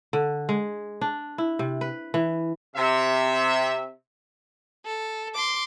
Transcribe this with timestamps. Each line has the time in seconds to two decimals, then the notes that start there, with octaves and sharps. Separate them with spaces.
0.13 D3
0.49 G#3
1.01 D4
1.38 E4
1.59 C3
1.81 B4
2.14 E3
2.76 C3 E5
4.85 A4
5.35 C6 D6